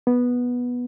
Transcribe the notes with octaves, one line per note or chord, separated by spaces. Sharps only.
B3